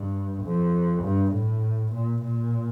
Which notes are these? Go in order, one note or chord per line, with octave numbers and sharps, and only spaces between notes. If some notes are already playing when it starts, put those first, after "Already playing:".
Already playing: G2
F2
G2
A2
A#2
A#2